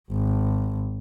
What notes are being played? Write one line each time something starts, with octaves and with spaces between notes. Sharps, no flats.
G#1